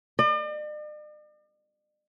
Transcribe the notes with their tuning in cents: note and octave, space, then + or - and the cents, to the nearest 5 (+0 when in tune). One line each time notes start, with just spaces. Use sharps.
D5 +45